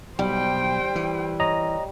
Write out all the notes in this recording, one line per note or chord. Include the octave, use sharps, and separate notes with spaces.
B1 G3 C5 G5
E3
C#5 D#5 A#5